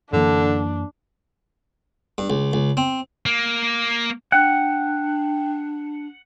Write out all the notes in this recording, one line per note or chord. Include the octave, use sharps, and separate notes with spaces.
F#2 D3 E3 A#3 D4
G2
C#2
C#2
C4
A#3
D4 F#5 G5